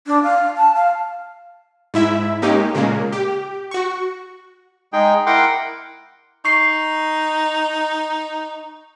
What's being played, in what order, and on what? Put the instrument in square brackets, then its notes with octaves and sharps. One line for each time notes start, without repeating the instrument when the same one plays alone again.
[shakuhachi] D4
F5
A5
F5
[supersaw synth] G#2 E4 E5
G#3 A#3 C#4 D#4 G4
A#2 C#3 G#3 A#3
G4
F#4 C#6
[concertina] G#3 D#4 G#4 G5
E4 A#4 F#5 G5 C6 D6
[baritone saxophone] D#4 [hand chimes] C#6 C7